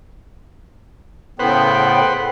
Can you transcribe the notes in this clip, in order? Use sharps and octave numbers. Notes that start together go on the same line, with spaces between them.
A2 C#3 B3 A4 B4 C5 F#5 G5